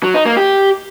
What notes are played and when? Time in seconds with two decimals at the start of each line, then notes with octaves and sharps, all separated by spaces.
0.03 F#3
0.14 D#4
0.26 A#3
0.37 G4